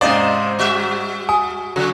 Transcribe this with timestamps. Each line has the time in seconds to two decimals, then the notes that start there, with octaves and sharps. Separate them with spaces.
0.01 G#2 C3 C#4 D#4 C5 D5 D#5 F5
0.59 G3 F#4 E5
1.29 G#5 D#6
1.76 C#3 F#3